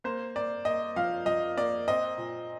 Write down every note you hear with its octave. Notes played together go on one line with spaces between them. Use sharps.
A#3 C5
A#3 D5
A#3 D#5
F3 F5
F3 D#5
A#3 D5
C4 D#5
A#2